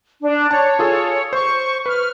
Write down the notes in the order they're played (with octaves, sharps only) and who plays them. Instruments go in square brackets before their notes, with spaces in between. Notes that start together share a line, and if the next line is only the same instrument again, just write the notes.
[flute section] D4
[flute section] C#5 [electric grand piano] A5
[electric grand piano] F4 G#4 A4
[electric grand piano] C5 [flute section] C#6
[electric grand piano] B4 [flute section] F6